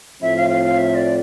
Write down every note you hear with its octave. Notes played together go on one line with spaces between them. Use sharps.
A2 F3 C4 F4 E5
F5
F5
F5
E5
D5